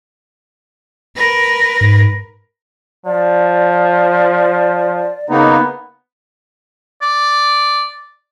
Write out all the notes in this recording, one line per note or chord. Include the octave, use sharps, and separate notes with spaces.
A#4 B4
G#2
F3 D5
C#3 A#3 B3 D#4
D5